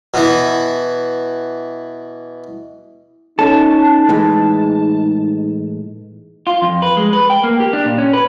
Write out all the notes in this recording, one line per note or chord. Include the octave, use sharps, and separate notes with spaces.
B2 E3
C#4 D#4 A4 A5
A2 E3 G#3
F4
F2
B4
G#3
B4
G5
A#3
G4
D4
A#2
C#4
B4